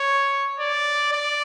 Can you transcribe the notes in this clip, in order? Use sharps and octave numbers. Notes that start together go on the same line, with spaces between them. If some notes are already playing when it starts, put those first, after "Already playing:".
Already playing: C#5
D5
D5